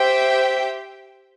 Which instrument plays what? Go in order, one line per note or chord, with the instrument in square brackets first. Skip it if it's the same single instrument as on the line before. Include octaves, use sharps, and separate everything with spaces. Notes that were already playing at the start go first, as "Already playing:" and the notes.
Already playing: [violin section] G4 C5 E5 G5